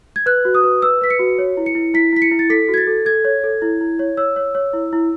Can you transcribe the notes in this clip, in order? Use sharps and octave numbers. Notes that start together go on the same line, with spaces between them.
G#6
B4 F#6
F#4
D#6
B4
B4 E6
B4 B6
C#7
F#4
C#5
E4
C#7
E4
E4 B6
E4 B6
C#7
E4
A6
A4 B6
F#4
G#6
A6
A4
A4 G#6
C#5
A4
E4
E4
C#5
C#5 E6
C#5
C#5
E4
E4